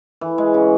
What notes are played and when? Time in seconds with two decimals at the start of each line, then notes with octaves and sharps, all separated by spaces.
0.21 E3
0.38 G#3
0.54 C#3